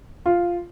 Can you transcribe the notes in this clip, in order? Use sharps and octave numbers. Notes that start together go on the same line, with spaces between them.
F4